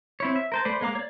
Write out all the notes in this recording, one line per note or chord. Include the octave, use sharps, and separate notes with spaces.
C4 E4 C#5
E5
A#4 C5 A5
A3 B4 C5 D5
G#3 A#3 F5 A#5 D6
C#5 D5